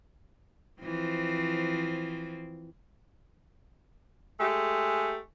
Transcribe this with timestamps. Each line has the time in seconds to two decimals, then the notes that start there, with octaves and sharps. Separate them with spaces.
0.81 E3 F3 C4
4.40 G#3 A3 G4